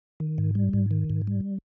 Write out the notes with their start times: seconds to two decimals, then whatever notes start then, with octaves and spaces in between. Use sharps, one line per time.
0.20 D#3
0.38 G#2
0.55 G3
0.73 G#2
0.91 D#3
1.10 G#2
1.27 G3